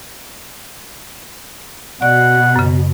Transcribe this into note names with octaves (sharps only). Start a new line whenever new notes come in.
B2 D5 F#5
F#2 C#3